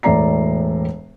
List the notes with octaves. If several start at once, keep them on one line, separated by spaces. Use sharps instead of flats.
E1 A2 D5 A#5 C7